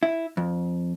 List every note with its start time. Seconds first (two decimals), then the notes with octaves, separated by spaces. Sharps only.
0.03 E4
0.37 F2